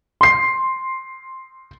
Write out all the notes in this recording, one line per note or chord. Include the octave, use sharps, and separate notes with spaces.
C6 C7